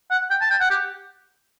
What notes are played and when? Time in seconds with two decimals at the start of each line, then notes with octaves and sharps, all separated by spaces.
0.11 F#5
0.30 G5
0.41 A5
0.50 G5
0.60 F#5
0.70 G4